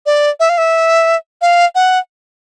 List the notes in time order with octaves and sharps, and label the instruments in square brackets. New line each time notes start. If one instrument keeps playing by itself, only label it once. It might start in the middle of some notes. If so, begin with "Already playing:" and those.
[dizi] D5
E5
F5
E5
F5
F#5